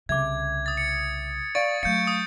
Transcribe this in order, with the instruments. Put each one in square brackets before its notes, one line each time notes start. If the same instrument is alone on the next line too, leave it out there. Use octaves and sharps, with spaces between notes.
[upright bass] C2 C#3 [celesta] E5 D6 [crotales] G#6
[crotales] D#6 A6
C#7
[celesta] D5 F5 [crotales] C#6 A6 D7
[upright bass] F#3 A3 [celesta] F5 [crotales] G6 C#7
[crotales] D#6